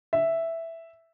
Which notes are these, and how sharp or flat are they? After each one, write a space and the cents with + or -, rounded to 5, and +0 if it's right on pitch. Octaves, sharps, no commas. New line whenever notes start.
E5 +0